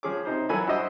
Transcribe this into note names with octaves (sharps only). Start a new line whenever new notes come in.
F3 C#4 G#4 C#5 D6
C3 D#4 C5
E3 F#3 A4 A#4 G#5 B5
G2 E4 F#4 C5 D#5 E6